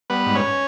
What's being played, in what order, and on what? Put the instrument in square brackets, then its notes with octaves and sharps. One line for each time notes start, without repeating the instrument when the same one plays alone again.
[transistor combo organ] G3 B3 B4
G#2
C#4 C#5